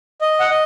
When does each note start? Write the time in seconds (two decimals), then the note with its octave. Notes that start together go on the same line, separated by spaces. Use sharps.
0.21 D#5
0.40 F#5
0.50 D#5